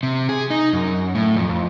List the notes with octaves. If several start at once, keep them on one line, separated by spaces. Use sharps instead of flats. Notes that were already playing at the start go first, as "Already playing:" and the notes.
C3
G#4
D#4
F#2
A2
F2
F2